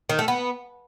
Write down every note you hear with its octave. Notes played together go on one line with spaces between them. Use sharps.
D#3
A3
B3